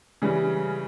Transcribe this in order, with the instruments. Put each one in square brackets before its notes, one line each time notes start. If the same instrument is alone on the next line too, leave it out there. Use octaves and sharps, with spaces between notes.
[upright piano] C#3 E3 G3